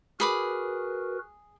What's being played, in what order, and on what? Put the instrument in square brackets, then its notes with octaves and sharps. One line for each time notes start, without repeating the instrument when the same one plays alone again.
[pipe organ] F#4 A#4 B4 [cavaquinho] G#4 B5 D6